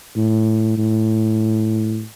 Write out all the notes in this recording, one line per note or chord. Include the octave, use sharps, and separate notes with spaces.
A2
A2